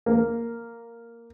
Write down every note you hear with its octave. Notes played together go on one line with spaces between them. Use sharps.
A#3